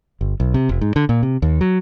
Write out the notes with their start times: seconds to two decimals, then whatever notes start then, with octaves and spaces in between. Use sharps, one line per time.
0.21 G1
0.40 B1
0.54 C3
0.69 F1
0.81 G#2
0.96 D3
1.09 A#2
1.23 C3
1.42 D#2
1.61 F#3